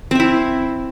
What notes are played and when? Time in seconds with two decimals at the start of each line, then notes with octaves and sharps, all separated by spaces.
0.11 C4
0.15 E5
0.20 E4